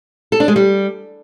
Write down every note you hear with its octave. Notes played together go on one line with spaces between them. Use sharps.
A4
D4
G#3
G3